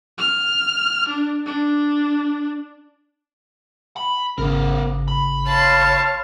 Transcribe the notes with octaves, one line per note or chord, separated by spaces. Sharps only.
F6
D4
D4
B5
G#1 C#3 B3 A#4
B5
C#5 F5 A5 C6